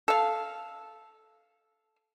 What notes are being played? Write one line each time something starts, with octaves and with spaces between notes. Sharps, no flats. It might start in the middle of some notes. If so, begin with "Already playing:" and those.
A4 F5